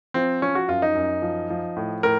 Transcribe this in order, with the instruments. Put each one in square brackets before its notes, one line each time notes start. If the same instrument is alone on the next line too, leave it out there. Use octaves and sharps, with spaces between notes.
[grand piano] F3 C4
F3 C#4
F#4
F#2 F4
D#4
F#2
F3
F3
A2
A2 A#4